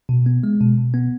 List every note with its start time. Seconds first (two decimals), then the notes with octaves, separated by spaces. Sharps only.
0.09 B2
0.26 B3
0.44 G#3
0.61 B2
0.78 B2
0.94 B3